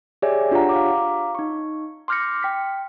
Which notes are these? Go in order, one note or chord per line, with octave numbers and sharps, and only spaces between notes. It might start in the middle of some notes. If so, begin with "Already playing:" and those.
G4 G#4 C#5 D5 E5 G#5
D4 F4 G4 C#5 F#5 A#5
F5 A#5 D6
D#4 C#6
C6 D6 F6 G6 A#6 C#7
G5 B6